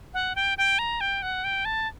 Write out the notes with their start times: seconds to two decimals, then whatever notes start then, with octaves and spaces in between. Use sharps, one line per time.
0.14 F#5
0.36 G5
0.58 G5
0.79 A#5
1.01 G5
1.22 F#5
1.44 G5
1.65 A5